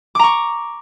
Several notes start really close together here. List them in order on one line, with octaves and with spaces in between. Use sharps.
D6 A#5 C#6